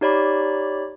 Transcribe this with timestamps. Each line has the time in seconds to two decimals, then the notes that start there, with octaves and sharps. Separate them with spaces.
0.01 D#4 G4 C#5 D5 B5